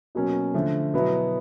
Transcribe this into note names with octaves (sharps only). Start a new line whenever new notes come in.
B2 F#3 A#3 C#4
D3 F3 A3
B2 F#3 B3 E4